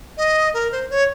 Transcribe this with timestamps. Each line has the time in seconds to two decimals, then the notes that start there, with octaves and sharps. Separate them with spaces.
0.17 D#5
0.54 A#4
0.72 C5
0.90 C#5